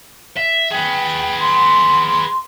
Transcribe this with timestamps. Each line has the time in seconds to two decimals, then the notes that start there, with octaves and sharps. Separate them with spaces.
0.37 E5
0.71 G#4 B4 G5
1.40 C6